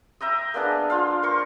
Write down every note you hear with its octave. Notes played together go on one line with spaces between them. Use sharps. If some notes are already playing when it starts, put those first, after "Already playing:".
E5 G5 A#5 D#6
A#3 B3 D4 G#4
F4 C5 F5
A#4 C5 C#6